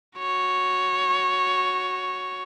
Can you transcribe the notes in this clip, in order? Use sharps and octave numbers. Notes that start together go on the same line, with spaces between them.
F#4 C#5